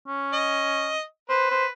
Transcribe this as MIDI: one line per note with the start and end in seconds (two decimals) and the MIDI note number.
0.08 0.93 61
0.33 1.02 75
1.29 1.70 71
1.29 1.47 72
1.51 1.65 72